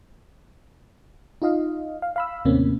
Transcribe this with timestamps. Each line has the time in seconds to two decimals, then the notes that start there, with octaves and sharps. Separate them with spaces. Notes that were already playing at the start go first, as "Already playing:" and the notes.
1.42 D#4 F4 D#5 F5
2.02 F5
2.16 F5 B5 E6
2.45 D#2 A2 C3 A#3 C4 C#4